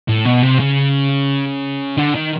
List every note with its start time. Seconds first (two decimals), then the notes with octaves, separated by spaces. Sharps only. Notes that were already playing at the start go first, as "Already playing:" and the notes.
0.08 A2
0.25 B2
0.43 C3
0.60 C#3
1.97 D3
2.15 D#3